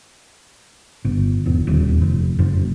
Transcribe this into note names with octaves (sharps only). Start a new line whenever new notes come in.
G1
E1
D#1
F1
F#1